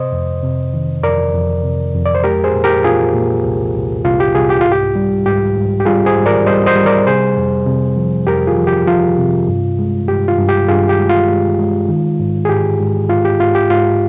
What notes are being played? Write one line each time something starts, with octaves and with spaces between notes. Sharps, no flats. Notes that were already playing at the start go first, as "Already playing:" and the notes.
Already playing: C3 C5 D#5
F2
C3
D#3
F2 A#4 D5
F2
C3
F2
D5
C5
G#3 G4 A#4
G#4 C5
A#2
G4 A#4
A#2 F4 G#4
A#2
C2
C2
C2 F4
G4
C2 F4 G#4
G4
G#2 F4
G4
G3
G#2 G4
G#2
G4
G3 F4 G#4
G#4 C5
G#2
A#4 D5
G3 C5 D#5
C5 D#5
G3
A#4 D5
C3 G#4 C5
F2
C3
F3
F2 G4 A#4
F4 G#4
F3
G4
F3 F4
C3
G2
G#3
G2 G4
F4
G2
G4
G2 F4 G#4
G4
G#3
F4
G#3
G#3
D#3
G#2
G#4
G#2 G4
G#2
G#2 F4
G4
G#2 F4
G4
G#2 F4